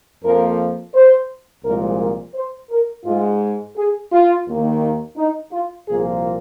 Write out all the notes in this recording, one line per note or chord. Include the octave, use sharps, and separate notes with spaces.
F2 F3 A#3 A#4
C5
C2 A#2 F3 G#3 A#4
A#4
C5
A#4
G#2 G#3 F4
G#4
F4
D#2 D#3 A#3
D#4
D#4
F4
C2 A#2 F3 A#3 G#4